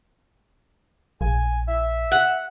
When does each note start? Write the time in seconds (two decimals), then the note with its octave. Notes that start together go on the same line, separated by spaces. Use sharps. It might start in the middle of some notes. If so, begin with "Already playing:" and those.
1.21 A#1 G#5
1.68 E5
2.11 F#5